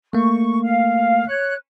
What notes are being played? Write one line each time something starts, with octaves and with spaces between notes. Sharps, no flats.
A3 A#3 C#6
F5
C#5 F#6